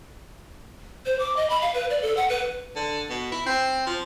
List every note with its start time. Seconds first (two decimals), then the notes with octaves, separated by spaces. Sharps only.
1.06 C5
1.19 D6
1.37 D#5
1.50 B5
1.62 F5
1.74 B4
1.90 D5
2.02 A4
2.17 F#5
2.30 B4
2.76 D3
3.10 B2
3.32 E4
3.46 C4
3.87 F3